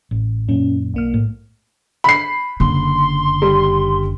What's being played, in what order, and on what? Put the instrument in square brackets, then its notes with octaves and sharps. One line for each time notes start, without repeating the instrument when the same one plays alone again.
[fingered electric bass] A1
[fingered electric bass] F#2 A#2 [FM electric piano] C#4
[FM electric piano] B1 A#3 F6
[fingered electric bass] A2
[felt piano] B5 C7
[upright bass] F#1 D3 [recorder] C6
[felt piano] G3